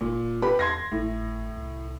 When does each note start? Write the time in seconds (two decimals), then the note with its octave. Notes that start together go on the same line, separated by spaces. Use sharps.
0.01 F#1 A#2
0.23 E1
0.42 G4 B4 B5
0.59 E2 C6 G#6 A#6
0.92 G#1 A2
1.57 C2